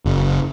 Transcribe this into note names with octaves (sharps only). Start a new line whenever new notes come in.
F#1